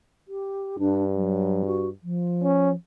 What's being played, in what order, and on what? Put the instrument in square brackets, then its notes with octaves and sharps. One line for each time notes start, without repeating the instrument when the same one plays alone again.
[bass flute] G4
[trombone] G2 [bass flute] D4
[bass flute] F#3
F#4
F3
[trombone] C#4